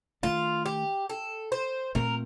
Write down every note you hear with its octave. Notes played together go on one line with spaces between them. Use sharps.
D#3 A3 D4 F4
G4
A4
C5
A#2 A3 C4 A#4